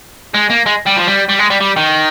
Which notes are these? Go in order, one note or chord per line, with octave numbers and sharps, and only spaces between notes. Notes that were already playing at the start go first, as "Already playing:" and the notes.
G#3
A#3
G#3
G3
F3
G3
G3
G#3
G3
G3
D#3